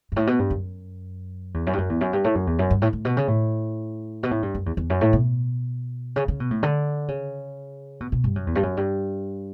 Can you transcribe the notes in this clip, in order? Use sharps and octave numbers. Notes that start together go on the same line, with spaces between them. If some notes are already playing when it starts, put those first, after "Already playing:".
G2
A2
B2
G2
F#2
E2
F#2
G2
F#2
E2
F#2
G2
A2
F#2
E2
F#2
G2
A2
A2
B2
C#3
A2
B2
A2
G2
F#2
E2
E2
F#2
A2
B2
C#3
C#3
B2
A2
D3
C#3
B2
B2
G2
F#2
E2
G2
F#2
G2